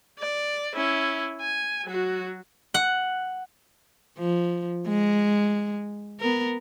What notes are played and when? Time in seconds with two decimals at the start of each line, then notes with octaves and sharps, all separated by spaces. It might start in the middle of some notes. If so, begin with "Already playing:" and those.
0.19 D5
0.75 C#4 E4
1.41 G#5
1.85 F#3 F#4
2.74 F#5
4.18 F3
4.88 G#3
6.20 B3 A#4